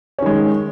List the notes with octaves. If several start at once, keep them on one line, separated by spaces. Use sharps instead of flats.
D#3 G#3 C#4